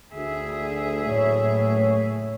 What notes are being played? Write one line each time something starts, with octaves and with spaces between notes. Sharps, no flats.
D2 G#4 E5
F#1 A2 C#5